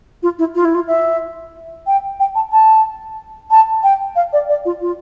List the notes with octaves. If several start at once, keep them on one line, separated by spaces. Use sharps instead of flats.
F4
E4
F4
E4
F4
E5
G5
G5
A5
A5
A5
G5
F5
D5
D5
F4
F4